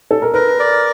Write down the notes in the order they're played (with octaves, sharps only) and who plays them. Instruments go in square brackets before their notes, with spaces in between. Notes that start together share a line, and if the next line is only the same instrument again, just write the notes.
[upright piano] A4
A#4
[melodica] A#4 [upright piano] B4
[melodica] D5